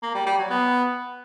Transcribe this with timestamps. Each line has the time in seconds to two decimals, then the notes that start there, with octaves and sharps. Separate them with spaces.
0.03 A#3
0.15 G3
0.26 G3
0.38 F#3
0.50 B3